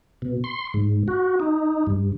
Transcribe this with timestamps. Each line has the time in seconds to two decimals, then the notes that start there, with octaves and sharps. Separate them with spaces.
0.22 B2
0.44 C6
0.74 G#2
1.08 F#4
1.40 D#4
1.87 G2